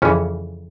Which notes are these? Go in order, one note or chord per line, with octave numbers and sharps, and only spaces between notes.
F2 C#3 E3 C#4